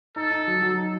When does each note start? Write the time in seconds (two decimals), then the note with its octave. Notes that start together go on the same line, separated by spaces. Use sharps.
0.16 D#4 A4
0.31 D#4
0.47 F#3
0.62 F#3
0.78 D#4